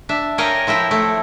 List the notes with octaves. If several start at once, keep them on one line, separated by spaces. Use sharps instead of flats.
D4 E5
A#4 C#5 D#5 F5 G5 G#5
F3 E4 A#4 G5
A3